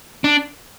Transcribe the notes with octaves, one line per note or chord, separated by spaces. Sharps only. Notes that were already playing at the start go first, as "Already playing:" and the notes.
D4